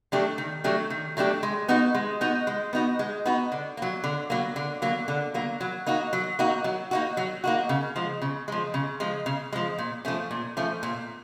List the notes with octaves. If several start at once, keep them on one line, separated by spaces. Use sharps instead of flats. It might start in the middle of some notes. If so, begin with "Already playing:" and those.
F#3 A3 D4 G4
D#3
F#3 A3 D4 G4
D#3
F#3 A3 D4 G4
G#3
B3 D#4 F#4
G#3
B3 D#4 F#4
G#3
B3 D#4 F#4
G#3
B3 D#4 F#4
D3
F#3 A#3
D3
F#3 A#3
D3
F#3 A#3
D3
F#3 A#3
F#3
A#3 D#4 F#4
F#3
A#3 D#4 F#4
F#3
A#3 D#4 F#4
F#3
A#3 D#4 F#4
C#3
F3 G#3
C#3
F3 G#3
C#3
F3 G#3
C#3
F3 G#3
A#2
F3 A3 C#4
A#2
F3 A3 C#4
A#2